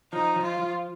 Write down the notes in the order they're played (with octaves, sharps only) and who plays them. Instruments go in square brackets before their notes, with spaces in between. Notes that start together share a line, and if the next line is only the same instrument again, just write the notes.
[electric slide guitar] F3 [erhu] D#4
[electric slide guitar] F3
[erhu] F4
[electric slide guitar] F3